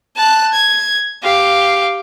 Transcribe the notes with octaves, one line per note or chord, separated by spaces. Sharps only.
A5 F#6
G#6
G4 F5